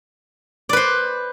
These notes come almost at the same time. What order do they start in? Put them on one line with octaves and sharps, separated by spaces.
D5 B4 C5